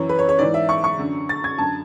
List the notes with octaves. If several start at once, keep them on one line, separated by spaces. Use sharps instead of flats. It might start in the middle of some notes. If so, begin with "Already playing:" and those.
Already playing: F#2 E3 C#5
B4
C#5
C#5
G#2 E3 D5
E5
C#6
C#6
F#2 D3
A6
G#6
F#2 D3 A5